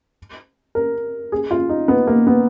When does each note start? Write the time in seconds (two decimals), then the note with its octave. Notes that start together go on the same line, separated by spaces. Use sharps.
0.75 A#4
1.32 G#4
1.51 F4
1.69 D#4
1.88 B3
2.07 A#3
2.27 B3